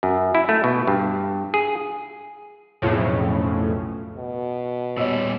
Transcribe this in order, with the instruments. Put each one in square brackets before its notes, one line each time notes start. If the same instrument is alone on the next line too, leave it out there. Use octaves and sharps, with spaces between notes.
[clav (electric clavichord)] F#2
E4
A3
B2
G2
G#4
[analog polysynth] B1 F2 A2 C#3
[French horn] B2
[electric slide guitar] A#2 G3 [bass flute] B3 [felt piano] C#5 D#5 E6